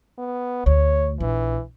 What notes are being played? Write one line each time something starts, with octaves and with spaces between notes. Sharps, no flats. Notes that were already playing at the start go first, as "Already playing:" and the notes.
B3
D2 C#5
A#1 E3